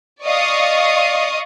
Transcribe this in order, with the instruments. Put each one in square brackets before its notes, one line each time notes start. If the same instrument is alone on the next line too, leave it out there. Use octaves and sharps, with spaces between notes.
[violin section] D5 D#5 F5 C#6 D#6